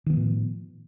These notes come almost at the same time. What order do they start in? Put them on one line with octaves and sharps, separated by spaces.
D#3 B3 F3 A2